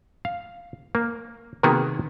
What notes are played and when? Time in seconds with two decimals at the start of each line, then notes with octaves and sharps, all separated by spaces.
0.25 F5
0.95 A#3
1.63 C3 D#3 A#3 B3 F#4 G#4